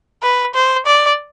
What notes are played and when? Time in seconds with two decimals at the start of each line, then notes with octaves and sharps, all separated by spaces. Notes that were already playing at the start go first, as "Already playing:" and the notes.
0.22 B4
0.54 C5
0.86 D5